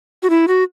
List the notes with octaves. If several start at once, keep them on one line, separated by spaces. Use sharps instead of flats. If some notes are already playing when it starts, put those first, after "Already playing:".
F#4
E4
F#4